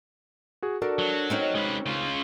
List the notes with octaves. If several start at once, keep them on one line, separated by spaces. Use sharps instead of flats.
F#4 G#4
D4 F#4 A4 A#4
F#3
C4 C#4 D#4
G#3 B4
C#3 F4